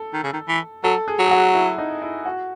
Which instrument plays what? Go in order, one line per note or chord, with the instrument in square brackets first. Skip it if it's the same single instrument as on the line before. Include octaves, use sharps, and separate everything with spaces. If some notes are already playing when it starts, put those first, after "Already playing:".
Already playing: [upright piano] A4
[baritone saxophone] D#3
C#3
D#3
E3
[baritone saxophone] F#3 [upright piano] A4
[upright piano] G#4
[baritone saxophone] F#3
[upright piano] G#4
F#4
E4
D#4
E4
F#4